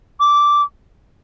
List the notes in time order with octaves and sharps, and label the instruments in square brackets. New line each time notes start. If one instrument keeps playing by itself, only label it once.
[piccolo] D6